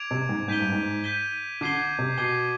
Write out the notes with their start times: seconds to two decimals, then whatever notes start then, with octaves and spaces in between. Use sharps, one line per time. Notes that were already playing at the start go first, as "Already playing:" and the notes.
Already playing: D6 G#6 D7 F7
0.11 C3
0.29 G#2
0.48 G#2 G6 B6 D#7 G7
0.60 G2
0.72 G#2
1.04 G6 B6 D#7 G7
1.61 D3 D6 G#6 C7 D#7 G7
1.99 C3
2.18 B2 D6 G#6 C7 D#7 G7